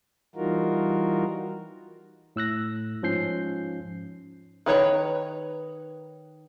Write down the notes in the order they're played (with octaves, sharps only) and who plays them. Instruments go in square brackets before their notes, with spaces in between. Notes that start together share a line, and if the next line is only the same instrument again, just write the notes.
[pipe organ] E3 G3 D#4 F4 F#4 A#4
[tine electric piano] A2 E6 F#6 A#6
G#2 F3 C#4 G6 C7
[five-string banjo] D#3 B4 C#5 A#5